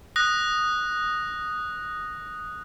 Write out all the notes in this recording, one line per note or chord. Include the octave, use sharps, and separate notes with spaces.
D#6 F#6 A#6